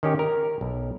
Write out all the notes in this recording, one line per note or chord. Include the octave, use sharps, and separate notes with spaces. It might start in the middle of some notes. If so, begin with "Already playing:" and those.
D#3 C#4 G4
A#4
B1